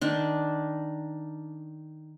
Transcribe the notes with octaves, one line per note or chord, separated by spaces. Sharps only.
D#3 D4